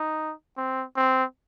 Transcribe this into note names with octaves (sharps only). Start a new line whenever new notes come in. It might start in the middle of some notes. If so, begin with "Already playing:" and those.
Already playing: D#4
C4
C4